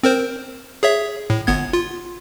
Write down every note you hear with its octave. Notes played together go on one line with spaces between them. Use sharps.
C4 A#4 C5
G#4 C#5 E5
A2
G1 B3 G#6
F4